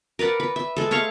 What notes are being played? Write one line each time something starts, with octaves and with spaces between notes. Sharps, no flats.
A#4 B4 D5 F#5
B4
E5
G#3 A4
A3 C#5 F5 C#6